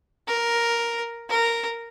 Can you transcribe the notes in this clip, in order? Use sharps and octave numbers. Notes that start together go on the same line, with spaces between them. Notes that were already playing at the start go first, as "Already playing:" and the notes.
A#4
A#4